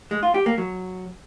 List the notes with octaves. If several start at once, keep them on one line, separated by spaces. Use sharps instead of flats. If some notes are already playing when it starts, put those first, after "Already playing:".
G#3
F4
G4
A#3
F#3